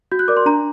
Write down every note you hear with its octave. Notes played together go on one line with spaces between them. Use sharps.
F#4 G6
F#6
A#4 D5 D6
C6
D4 A#5